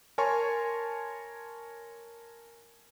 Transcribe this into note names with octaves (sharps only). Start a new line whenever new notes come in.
A#4 C#5 G#5 A5 C6 C#6